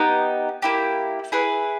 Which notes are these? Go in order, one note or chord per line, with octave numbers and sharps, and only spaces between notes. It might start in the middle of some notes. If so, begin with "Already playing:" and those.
Already playing: B3 D#4 G4
A#3 E4 G4
E4 G#4 B4